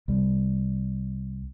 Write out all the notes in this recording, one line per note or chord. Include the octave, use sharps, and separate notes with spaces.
C2 G3